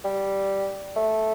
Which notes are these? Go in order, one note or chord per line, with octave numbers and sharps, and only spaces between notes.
G3
A3